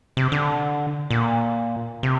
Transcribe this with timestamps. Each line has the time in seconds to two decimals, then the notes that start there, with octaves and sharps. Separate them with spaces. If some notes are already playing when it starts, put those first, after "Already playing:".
0.17 C3
0.32 D3
1.10 A#2
2.03 C3